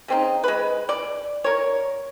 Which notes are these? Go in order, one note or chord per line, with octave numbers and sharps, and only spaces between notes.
C#3 C4 D#4
G#3 B4
D5
A#4 C#5